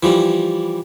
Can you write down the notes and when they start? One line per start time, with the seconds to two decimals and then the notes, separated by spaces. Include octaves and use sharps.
0.03 E3 F3 G3